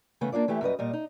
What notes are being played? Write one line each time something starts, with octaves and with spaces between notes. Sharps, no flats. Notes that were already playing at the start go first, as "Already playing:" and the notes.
C#3 E3 A3 B3
A#3 D4 F4 D5
E3 A3 E4 G4
F#2 G3 B4 D#5
A#2 G3 D#5
D#4